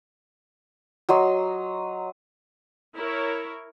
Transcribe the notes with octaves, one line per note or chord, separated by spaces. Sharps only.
F#3 D#5 C6
E4 A#4 C#5